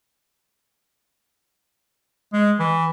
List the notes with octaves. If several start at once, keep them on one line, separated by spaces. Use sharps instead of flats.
G#3
E3